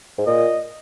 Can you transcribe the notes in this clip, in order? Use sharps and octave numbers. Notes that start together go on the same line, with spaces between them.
G#2
A#2 D#5